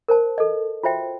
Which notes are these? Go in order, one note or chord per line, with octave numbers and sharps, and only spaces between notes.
A#4 C5 A5
A4 D#5
F4 F#4 C5 E5 G5